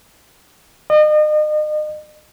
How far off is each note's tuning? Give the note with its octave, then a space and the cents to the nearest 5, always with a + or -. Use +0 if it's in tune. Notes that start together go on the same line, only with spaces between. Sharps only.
D#5 -35